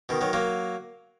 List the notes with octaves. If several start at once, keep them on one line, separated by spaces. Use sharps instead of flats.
B2 D#3
D#3 F#3
F#3 A#3